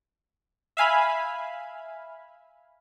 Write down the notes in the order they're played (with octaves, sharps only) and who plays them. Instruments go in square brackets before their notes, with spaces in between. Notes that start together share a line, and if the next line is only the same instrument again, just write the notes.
[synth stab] E5 F5 G#5 B5